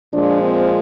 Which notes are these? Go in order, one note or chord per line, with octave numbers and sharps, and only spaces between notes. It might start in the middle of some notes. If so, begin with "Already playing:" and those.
A#2 F3 G#3 D4
C4